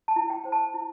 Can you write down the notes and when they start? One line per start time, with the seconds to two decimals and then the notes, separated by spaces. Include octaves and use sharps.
0.08 A5
0.16 E4
0.30 G5
0.44 C5 G5
0.52 A5
0.74 E4